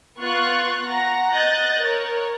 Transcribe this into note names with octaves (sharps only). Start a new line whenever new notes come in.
B3 F4 C#6 F#6 A6
F#5 A#5 A#6
D#5 F#6 G6 A6 A#6
A#4 C#5